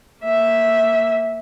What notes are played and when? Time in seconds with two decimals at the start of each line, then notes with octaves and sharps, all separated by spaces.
0.23 A#3 E5